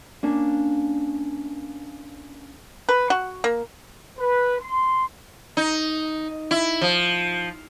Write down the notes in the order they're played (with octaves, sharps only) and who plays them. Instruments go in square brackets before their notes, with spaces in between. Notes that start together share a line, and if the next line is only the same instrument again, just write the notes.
[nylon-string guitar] A#3 C#4 D4
[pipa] B4
F#4
A#3
[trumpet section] B4
C6
[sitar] D#4
E4
F3